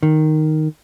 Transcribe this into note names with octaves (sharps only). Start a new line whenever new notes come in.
D#3